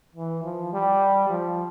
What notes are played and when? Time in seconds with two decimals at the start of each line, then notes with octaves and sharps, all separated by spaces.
0.15 E3
0.43 F3
0.73 G3
1.30 F3